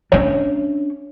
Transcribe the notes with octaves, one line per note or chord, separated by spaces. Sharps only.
C#4 D4 C#5 E5